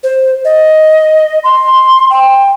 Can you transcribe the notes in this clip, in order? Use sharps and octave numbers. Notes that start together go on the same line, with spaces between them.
C5
D#5
C6
G5